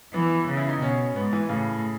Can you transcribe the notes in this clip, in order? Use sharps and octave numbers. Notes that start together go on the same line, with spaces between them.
E3 B3
C#3
E4
D#4
B2 C#4
G#2 B3
E3
A2 C#3